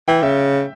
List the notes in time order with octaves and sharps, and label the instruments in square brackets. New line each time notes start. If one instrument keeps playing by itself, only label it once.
[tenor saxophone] E3 [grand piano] G5
[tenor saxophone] C#3 [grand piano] E5